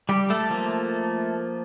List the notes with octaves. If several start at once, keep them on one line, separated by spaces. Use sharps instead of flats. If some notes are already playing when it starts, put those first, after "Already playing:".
G3 G4
A3 A4
F3 A#3